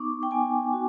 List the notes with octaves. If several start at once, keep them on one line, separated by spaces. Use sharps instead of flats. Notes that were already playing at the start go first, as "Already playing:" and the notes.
Already playing: B3 D#4 C#6 D6
G5
B3 G#5
F#4